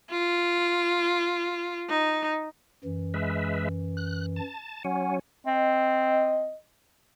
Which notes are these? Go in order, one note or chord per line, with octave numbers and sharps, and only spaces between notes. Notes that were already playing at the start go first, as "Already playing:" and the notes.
F4
D#4
F#2 E3
G#3 B4 E5
F#6
A5
F#3 C#4 F#5 G#5
C4 D#5